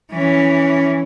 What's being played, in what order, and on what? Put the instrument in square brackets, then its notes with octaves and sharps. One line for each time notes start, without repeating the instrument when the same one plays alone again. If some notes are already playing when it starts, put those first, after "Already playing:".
[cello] E3 C#4